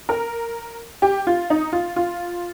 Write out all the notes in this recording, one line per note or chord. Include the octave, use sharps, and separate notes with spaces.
A#4
G4
F4
D#4
F4
F4